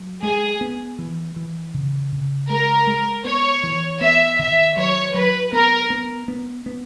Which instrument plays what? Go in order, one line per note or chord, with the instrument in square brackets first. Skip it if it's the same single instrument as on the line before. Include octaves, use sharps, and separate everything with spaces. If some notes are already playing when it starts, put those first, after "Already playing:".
Already playing: [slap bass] F#3
[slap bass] G#3 [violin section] G#4
[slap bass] B3
E3
E3
C#3
C#3
[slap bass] G#3 [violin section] A#4
[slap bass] G#3
[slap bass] B3 [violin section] C#5
[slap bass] E3
[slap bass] B3 [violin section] E5
[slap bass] D#3 [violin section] E5
[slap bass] F#3 [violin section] C#5
[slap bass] F#3 [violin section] B4
[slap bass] B3 [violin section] A#4
[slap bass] B3
B3
B3